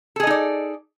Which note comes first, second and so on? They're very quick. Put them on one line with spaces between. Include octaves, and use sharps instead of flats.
A4 G#4 D#5 D#4 D5